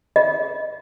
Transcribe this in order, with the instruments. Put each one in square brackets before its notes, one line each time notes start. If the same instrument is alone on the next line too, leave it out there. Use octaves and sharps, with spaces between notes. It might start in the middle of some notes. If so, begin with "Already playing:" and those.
[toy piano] D#5